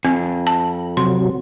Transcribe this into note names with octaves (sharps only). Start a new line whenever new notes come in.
F2 C4
A5
C3 F#3 C6